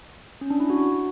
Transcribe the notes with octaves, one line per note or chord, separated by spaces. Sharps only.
C#4
D4
E4
F#4